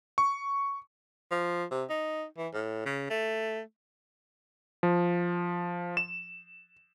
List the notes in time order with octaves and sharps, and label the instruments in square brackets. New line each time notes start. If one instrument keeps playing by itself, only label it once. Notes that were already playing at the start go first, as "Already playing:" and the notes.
[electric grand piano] C#6
[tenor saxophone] F3
C3
D#4
E3
A2
C#3
A3
[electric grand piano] F3
E7